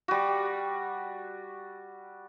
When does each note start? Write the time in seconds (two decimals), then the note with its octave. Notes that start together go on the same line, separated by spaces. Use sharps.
0.08 G3 F#4